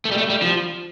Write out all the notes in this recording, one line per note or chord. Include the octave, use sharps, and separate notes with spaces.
A3
G3
A3
G3
F3